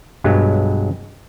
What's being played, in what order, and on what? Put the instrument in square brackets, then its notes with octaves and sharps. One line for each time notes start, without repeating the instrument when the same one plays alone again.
[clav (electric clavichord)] B1 G2 F#3 G#3 B3